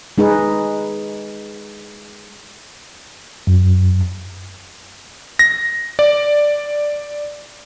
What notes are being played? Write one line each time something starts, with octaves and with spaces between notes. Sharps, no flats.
G#3 D#4 G#4 B4
F#2
A#6
D5